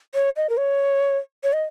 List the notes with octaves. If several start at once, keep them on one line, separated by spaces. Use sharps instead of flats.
C#5
D#5
A#4
C#5
C#5
D#5